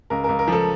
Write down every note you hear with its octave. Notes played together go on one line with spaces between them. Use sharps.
C#2 A#4
C#2 A#4
A#4
F3 A4